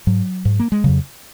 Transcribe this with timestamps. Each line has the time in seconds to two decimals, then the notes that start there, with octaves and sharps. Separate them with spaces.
0.07 G#2 F#3
0.45 G#2
0.60 A#3
0.72 G#3
0.84 F2 C#3 F#3